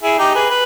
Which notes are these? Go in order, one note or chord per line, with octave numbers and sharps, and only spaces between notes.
E4 G#4
D#4 G4
G#4 B4
B4